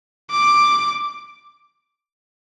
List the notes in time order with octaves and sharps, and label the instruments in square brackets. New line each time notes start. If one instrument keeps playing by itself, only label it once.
[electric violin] D6